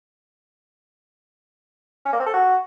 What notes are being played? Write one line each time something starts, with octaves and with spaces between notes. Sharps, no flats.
C#4
A#3
C4
A4
F#4